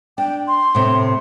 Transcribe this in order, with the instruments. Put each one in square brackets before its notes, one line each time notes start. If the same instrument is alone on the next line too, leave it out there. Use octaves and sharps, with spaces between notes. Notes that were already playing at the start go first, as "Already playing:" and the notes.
[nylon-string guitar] D4 [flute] G5
[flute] C6
[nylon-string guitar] A2 C3